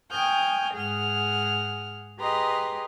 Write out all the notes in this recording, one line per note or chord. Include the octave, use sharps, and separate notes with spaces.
G5 G#5 C#6 D#6 F6 G6
G#2 G#4 F#5 F6
G4 G#4 B4 D#5 A#5 C6